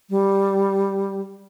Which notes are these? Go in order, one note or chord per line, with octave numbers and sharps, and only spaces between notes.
G3